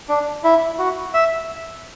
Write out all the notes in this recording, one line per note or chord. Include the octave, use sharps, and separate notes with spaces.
D4
E4
F#4
E5